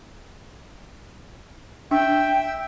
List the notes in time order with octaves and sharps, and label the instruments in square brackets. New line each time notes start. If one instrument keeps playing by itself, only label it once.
[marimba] D4 [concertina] E5 [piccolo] G5